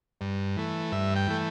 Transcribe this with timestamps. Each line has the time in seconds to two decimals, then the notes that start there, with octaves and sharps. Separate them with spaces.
0.21 G2
0.57 E3 A3
0.92 G2 E5
1.16 G5
1.28 E3 A3